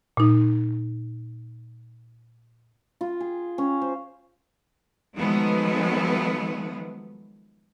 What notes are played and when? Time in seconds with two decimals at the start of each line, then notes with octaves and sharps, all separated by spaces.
0.17 A#2 D#4
3.01 F4
3.20 G#4
3.58 C#4
3.82 C5
5.14 D#3 F3 F#3 G#3 A3 B3